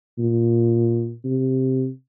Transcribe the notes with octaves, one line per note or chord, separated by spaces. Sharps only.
A#2
C3